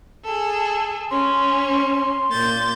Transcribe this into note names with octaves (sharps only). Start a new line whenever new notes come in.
G#4 A4
C#4 C6
A#2 G6 A6